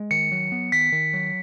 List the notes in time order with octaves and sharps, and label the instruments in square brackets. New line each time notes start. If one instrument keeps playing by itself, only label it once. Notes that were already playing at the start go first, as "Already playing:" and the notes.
Already playing: [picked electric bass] G#3
[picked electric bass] D#3 [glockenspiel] C#7
[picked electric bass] F#3
B3
[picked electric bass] D#3 [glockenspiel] B6
[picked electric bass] D#3
F#3